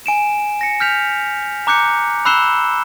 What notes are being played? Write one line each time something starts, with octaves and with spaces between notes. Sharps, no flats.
G#5 D7 E7
A#6 C#7
F6 G6 B6 F7
A#5 D6 F#6 G6 C#7
B5 E6 F#6 C7 E7 G7